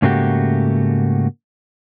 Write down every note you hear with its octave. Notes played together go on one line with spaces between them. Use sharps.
G#2 C#3 A3 A#3 F#4 G4